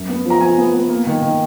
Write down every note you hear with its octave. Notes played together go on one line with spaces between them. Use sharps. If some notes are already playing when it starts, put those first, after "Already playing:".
Already playing: F#2
B3
F3
A#5
F3 G#5
B3
B3
A#3
D#3
D#3